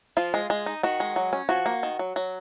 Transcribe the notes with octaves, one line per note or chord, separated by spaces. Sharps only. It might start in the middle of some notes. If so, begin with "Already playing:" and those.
F3 F4
G#3
G#3
D#4
D#3 F#4
G#3
F#3
C#4
F3 F#4
A#3
D#3
F#3
F#3